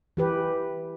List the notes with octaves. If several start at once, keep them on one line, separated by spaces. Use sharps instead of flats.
E3 G4 B4